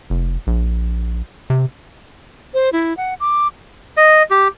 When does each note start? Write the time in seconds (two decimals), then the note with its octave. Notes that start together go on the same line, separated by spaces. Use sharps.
0.10 F1
0.47 A#1
1.50 C3
2.54 C5
2.73 E4
2.97 F#5
3.20 D6
3.97 D#5
4.31 G4